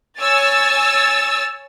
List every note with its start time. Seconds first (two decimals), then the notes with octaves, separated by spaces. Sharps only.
0.21 C#5 G#5 E6 A6